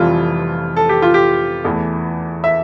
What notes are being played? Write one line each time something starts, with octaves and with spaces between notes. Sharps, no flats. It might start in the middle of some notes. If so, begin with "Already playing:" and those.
Already playing: F1 F2 E3 G3 F4
A4
G4
F4
G4
E2 E3 A3
E5